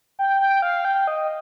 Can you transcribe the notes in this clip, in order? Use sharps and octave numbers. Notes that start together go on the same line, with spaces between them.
G5
G5
F5
G5
D#5